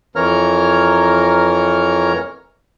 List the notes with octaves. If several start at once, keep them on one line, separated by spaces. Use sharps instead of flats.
F2 E3 A#4 C#5 A#5 F6